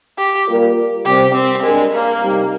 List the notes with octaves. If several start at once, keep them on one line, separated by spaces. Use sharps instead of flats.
G4
G3 A#3 F4 A#4
C3 G3 C4 G4
C4
G3 G#3 D4 G4 A#4
A#3
C3 G3 C4 D#4 G4